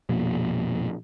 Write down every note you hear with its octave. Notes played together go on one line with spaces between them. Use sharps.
A#1 F2 B2 A#3